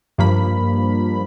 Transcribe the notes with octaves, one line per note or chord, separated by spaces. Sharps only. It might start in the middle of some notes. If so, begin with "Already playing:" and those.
G2 F3 A#3 B5